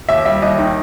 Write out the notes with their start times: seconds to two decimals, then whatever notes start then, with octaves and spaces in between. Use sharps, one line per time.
0.09 D#2 E5
0.26 G3 E5
0.42 D#2 D#5
0.58 D#3